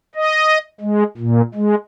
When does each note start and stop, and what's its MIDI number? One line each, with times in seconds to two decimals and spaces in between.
0.15 0.58 75
0.80 1.03 56
1.18 1.41 46
1.54 1.75 56